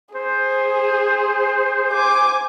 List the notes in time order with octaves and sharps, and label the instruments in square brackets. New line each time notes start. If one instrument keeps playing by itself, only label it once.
[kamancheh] G#4 [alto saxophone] C5
[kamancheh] G#5 D6